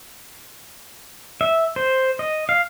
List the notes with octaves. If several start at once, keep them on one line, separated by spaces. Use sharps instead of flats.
E5
C5
D#5
F5